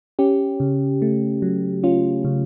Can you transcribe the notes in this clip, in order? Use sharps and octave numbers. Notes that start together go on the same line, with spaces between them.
C#4 G4
C#3
A3
F#3
C#4 F4
C#3